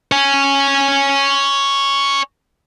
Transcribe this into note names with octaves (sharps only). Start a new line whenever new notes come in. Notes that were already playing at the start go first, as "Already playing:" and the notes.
C#5 G#5